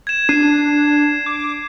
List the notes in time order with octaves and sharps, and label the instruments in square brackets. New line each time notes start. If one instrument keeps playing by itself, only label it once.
[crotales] G#6 E7
[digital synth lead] D4 [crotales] C7 D#7
[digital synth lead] D6